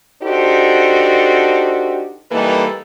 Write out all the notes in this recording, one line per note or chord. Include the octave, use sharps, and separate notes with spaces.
D4 D#4 F#4 G4 A4 C5
E3 G3 A#3 D#4 A4 B4